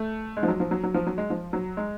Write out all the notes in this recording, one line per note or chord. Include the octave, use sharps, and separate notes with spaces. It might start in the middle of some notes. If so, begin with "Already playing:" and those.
Already playing: A3
G#3
F3
F#3
F3
F#3
F#3
F3
F#3
G#3
F3
F#3
G#3